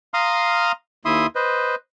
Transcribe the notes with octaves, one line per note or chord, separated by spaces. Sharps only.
F5 A#5 C6 D#6 F6
D#2 E4 E5 C6 D#6
B4 C5 D#5